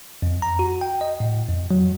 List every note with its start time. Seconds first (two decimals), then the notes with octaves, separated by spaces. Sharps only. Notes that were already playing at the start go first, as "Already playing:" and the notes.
0.22 F2
0.42 A#5
0.59 F#4
0.81 G5
1.01 D#5
1.20 A2
1.48 F2
1.71 F#3